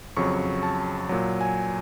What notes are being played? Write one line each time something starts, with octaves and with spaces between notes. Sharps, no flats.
F2 C#3 F#3 C#6
A5
A#2 F#3
G#5